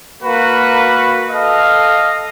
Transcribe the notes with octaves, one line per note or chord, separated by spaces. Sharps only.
A#3 F#4 B4
A4 D#5 F5